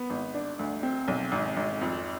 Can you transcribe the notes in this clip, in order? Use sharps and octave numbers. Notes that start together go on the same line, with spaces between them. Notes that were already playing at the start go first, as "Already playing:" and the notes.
Already playing: B3
G#1
D4
D2
C4
B1
G#1
G#1
F2